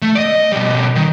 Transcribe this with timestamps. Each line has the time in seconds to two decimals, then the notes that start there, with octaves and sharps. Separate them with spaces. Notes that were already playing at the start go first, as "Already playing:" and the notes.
0.02 A3
0.15 D5 D#5
0.52 B2 G3
0.96 D#3